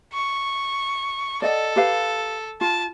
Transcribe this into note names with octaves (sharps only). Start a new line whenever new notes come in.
C#6
A4 D5 D#5 F#5
G4 B4 F5
F4 A5